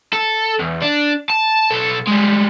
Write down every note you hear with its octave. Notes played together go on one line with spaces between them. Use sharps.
A4
E2
D4
A5
B1 A4
G3 G#3